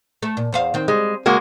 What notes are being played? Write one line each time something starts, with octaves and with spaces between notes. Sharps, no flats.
A3
A#2
E2 C5 F5
D#3 C4
G3 G#3
C#3 G#3 A#3 F#4